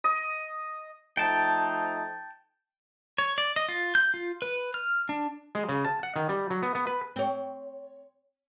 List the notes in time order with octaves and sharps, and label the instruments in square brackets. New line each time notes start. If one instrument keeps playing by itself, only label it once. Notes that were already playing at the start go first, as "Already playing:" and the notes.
[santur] D#5
[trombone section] F3 A3 D#4 [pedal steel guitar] G5 A5
[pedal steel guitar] C#5
D5
D#5
F4
G6
F4
B4
F6
D4
[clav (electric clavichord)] G#3
C#3
A5
F#5
D#3
G3
F#3
B3
B3
B4
[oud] C4 C#5